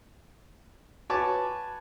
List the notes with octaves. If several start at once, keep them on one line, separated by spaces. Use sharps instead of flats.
F#4 B4 C#5 G#5 A5 D6